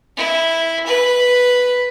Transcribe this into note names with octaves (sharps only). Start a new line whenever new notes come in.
E4
B4